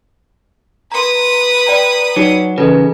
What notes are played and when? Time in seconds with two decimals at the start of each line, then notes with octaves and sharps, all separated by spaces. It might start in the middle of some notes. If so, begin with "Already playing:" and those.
0.92 B4 A#5 C6 D#6
1.67 D5 G5 A#5
2.16 F#3 D#4
2.58 C#3 E3 A4 B4